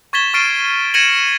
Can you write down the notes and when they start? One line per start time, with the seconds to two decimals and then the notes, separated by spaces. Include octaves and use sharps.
0.13 C#6 G#6 A6 B6 E7 G7
0.34 C#6 F6 A6 C7 D7 D#7
0.94 G#6 A#6 C#7 D#7 E7 F#7